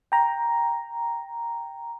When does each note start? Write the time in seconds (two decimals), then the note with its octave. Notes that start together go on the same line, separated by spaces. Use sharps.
0.12 G5 A#5